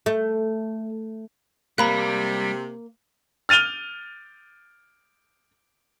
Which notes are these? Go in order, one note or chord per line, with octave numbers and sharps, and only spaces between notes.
A3
C3 G3 A#3 A#5 B5 F#6
F6 A6 D#7 F7 G7